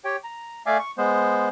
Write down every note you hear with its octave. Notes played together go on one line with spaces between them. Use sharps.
G4 C#5 G5
A#5
A3 D5 E5 F5 G#5 D6
C#6
G#3 B3 C5